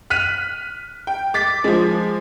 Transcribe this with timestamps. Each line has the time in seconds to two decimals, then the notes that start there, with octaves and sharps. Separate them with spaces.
0.10 F6 F#6 B6 D#7
1.07 G5
1.34 D6 A6 B6
1.64 F3 G#3